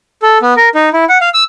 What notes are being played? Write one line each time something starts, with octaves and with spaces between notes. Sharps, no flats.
A4
B3
A#4
D#4
E4
F#5
F5
E6